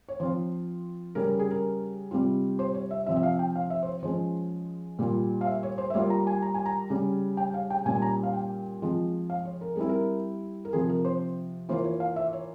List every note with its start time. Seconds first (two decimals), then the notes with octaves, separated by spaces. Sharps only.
0.08 C#5
0.20 F3 C4 F4 C5
1.15 C#3 G3 C#4 A#4
1.28 A#4
1.39 G#4
1.51 A#4
2.11 C3 G3 C4 F4
2.59 C5
2.75 C#5
2.91 E5
3.06 C3 F3 C4 E5
3.17 E5
3.23 F5
3.39 G5
3.56 F5
3.70 E5
3.83 C5
3.86 C#5
4.03 F3 G#3 C#4 C5
4.99 A#2 G3 A#3 F4
5.41 F5
5.46 E5
5.63 C#5
5.78 C5
5.90 E5
5.94 G3 A#3 F4 C#5
6.10 A#5
6.27 G#5
6.42 A#5
6.54 G#5
6.66 A#5
6.90 C#3 G3 C#4
7.37 G5
7.54 F5
7.70 G5
7.86 A#2 G3 C#4 G#5
7.96 G#5
8.02 A#5
8.23 F5
8.33 G5
8.82 F3 G#3 C4 F4
9.30 F5
9.45 C#5
9.61 A#4
9.76 G3 C4 E4 G#4
9.89 A#4
10.65 A#4
10.73 C3 F3 C4 G#4
10.89 A#4
11.05 C5
11.69 E3 A#3 F4 C5
11.84 C#5
12.00 F5
12.16 E5
12.33 C#5